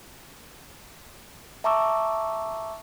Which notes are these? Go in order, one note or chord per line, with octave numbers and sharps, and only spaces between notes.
E5 A5 A#5 C#6 D6 E6